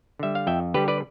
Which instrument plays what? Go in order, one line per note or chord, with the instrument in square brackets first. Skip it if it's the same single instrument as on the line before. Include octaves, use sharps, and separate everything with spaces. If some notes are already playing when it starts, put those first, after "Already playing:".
[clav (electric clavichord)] D3 G3 E5
F5
F2 E5 G5
D3 G3 G4 B4
B4 D5